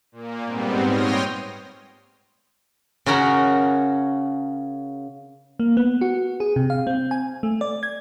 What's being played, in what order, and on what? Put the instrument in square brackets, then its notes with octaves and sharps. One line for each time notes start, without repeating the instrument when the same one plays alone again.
[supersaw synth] A#2 A#3
G#2 G3 B3 C4
C#5 G5 C6 D#6 F6 A#6
[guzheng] C#3 C#4 F#4 A#4 F#5 A#5
[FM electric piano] A#3
B3
F#4
G#4
C3
F5
C4
G#5
A3
D5
G#6